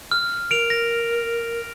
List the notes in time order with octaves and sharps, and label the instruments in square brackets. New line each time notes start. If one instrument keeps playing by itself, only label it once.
[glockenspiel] F6
[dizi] A#4 [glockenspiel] D7 F7
[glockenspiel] A#6